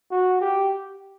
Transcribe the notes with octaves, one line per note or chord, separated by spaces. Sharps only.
F#4
G4